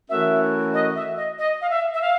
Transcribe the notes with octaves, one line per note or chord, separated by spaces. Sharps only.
E3 A3 C#4 F#4 A#4 E5
D#5
E5
D#5
D#5
F5
E5
E5
F5